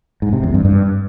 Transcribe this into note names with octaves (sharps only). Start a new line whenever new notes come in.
G#2
C3
E2
G2
G2